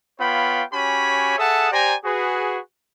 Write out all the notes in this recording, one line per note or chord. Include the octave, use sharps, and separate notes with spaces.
B3 F4 C#5 F5 G5 B5
C#4 F#4 G4 C#5 G#5 B5
G#4 A4 E5 F#5 A5 D#6
G4 C5 D5 G#5 A#5
F#4 G#4 B4